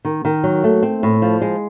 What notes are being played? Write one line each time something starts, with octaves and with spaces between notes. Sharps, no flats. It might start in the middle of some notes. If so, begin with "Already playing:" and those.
D#3
D#3
F#3
A3
C4
A2
F3
G#3